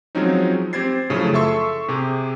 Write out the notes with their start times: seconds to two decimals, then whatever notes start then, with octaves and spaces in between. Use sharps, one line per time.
0.15 F3 F#3 G#3 C4 C#4 D#4
0.73 C4 G4 C5 G#6 A6 C7
1.10 F#2 C#3 F3 A3 C#4 E4
1.34 A4 E5 C6 C#6 E6
1.88 C3 G4 G#4